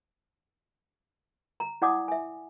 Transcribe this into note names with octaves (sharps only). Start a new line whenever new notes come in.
A#5
E4 D5 F#5 G#5 D6 D#6
E5 G#5